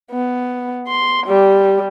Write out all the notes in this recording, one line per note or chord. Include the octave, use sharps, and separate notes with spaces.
B3
C6
G3